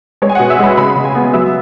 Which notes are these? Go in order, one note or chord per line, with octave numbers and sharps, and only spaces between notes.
G#3 C#5
G#5
B2 F#5
E5
G#3 B5
C#3 B5
C#3
G#5
B3
F#3 E5